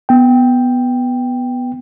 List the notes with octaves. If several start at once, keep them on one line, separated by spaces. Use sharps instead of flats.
B3 G5